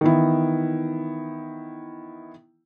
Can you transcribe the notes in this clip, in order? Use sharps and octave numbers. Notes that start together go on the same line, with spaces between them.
D#3 E3 B3 E4